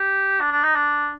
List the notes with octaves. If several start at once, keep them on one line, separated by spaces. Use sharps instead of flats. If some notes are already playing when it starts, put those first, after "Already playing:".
Already playing: G4
D4
D4
D#4
D4